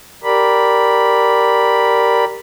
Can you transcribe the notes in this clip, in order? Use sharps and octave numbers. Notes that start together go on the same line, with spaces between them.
G4 A#4 D5 B5